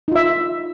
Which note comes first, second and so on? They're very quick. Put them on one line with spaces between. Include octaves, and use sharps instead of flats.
D#4 F4 E5